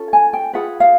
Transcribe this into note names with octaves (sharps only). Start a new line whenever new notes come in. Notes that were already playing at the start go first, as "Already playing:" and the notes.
Already playing: C#4 F4 A4
G#5
G5
F4 G#4 B4 F#5
F5